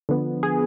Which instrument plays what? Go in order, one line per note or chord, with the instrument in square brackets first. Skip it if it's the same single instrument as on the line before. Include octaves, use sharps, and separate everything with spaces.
[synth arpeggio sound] D3 F3 B3
G#4